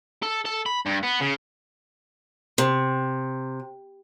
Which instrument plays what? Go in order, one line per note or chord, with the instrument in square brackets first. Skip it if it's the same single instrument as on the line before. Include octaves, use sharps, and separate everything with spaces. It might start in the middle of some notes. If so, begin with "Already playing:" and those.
[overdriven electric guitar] A4
A4
B5
G2
B3
C#3
[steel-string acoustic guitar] C3